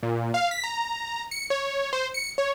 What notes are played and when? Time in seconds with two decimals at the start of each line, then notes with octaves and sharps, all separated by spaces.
0.03 A#2
0.34 F5
0.51 B6
0.64 A#5
1.31 C#7
1.50 C#5
1.93 C5
2.14 C#7
2.38 C#5